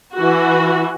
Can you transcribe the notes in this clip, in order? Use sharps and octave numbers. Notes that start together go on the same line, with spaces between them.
E3 F#4